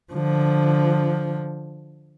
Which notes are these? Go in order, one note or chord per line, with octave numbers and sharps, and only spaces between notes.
D3 F3